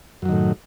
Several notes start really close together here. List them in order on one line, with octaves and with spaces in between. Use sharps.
F#2 F#3 D#3 A2